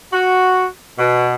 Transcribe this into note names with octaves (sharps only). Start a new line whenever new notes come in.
F#4
B2